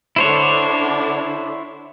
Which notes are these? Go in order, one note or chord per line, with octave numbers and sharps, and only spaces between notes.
D3 D4 E4 C5 C#5